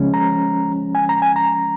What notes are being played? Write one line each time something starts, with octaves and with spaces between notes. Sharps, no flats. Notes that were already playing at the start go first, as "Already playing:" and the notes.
Already playing: C#3 F3 G#3 C#4
A#5
G#5
A#5
G#5
A#5